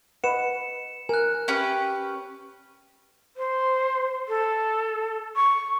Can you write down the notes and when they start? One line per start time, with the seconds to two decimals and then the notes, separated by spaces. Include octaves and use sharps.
0.24 B4 D#5 F#5 C#7 E7
1.09 A#4 G#5 F#6
1.48 C#4 G4 B4
3.37 C5
4.28 A4
5.36 C#6